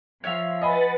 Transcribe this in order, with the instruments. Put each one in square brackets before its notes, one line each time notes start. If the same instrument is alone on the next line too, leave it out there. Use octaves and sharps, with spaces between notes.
[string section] F3 [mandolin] C#5 E5 F5
[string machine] B4 F#5 A6 [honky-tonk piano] D#5 G#5 B5